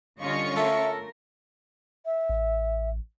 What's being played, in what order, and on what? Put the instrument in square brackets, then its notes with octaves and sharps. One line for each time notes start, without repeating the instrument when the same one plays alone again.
[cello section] D3 G3 D#5 [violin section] C#4 F4 C#6
[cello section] A3 A#4 [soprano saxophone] A4 [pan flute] E5
[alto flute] E5
[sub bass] A1